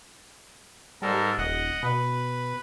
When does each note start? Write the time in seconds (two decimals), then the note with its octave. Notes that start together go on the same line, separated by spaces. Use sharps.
1.02 G#2 G3 A4 A#4
1.38 D#1 D#5 F#5
1.83 B2 B4